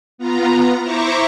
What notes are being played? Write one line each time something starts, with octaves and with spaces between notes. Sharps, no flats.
B3 F4 A#5
E4 C5 E5 A#5 C#6 D6